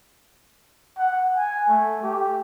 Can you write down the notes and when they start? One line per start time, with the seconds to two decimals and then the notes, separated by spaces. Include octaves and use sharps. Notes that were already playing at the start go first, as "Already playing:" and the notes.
0.98 F#5
1.36 G#5
1.68 A3
2.03 G4